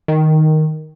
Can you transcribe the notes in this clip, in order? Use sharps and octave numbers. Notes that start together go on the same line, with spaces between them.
D#3